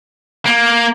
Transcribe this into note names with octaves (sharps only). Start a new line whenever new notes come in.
A#3